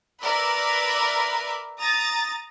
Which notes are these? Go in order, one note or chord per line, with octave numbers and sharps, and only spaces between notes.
A#4 B4 D5 E5 B5
A#5 D#6 A6